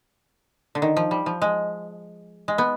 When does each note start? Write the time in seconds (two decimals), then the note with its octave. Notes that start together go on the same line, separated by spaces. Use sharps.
0.75 D3
0.82 D#3
0.97 F3
1.11 G3
1.26 F3
1.42 G#3
2.48 G#3
2.58 B3